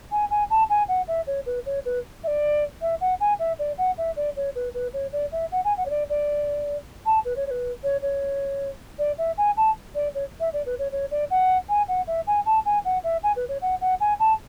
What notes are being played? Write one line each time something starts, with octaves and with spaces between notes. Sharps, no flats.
G#5
G#5
A5
G#5
F#5
E5
C#5
B4
C#5
B4
E5
D5
E5
F#5
G#5
E5
D5
F#5
E5
D5
C#5
B4
B4
C#5
D5
E5
F#5
G#5
F#5
C#5
D5
D5
A5
B4
C#5
C#5
B4
C#5
C#5
D5
E5
G#5
A5
D5
C#5
E5
D5
B4
C#5
C#5
D5
F#5
G#5
F#5
E5
G#5
A5
G#5
F#5
E5
G#5
B4
C#5
F#5
F#5
G#5
A5